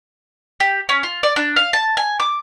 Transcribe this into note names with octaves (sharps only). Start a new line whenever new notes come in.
G4
C#4
F4
D5
D4
F5
A5
G#5
D6